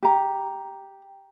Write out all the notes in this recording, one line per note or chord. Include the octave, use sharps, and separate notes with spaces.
G4 A#5